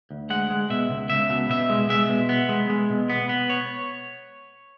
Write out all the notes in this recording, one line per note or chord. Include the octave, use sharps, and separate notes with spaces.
D2
G#3 F#5
G#3
B2 E5
C#2
C#2 E5
B2
B2 E5
G#3
G#3 E5
B2
B3
G#3
G#3
B2
B3
B3
C#5